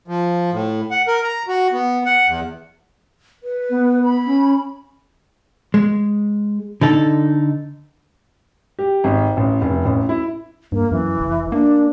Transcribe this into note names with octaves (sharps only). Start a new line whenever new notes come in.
F3
A2
F#5
A#4
A#5
F#4
B3
F#5
E2
B4
B3
B5
C#4
G#3
D3 D#4 A4
G4
G#1
A1
F1
A1
E4
G2 A#3
F#2 E3
F1
A#3 D4